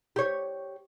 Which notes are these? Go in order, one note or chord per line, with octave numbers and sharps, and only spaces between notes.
G4 C#5